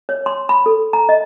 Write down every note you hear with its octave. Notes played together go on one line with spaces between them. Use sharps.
C#5
C6
B5
A4
A#5
D#5